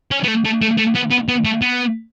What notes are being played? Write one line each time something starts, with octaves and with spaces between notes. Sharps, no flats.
C#4
B3
A3
A3
A3
A3
B3
B3
B3
A3
B3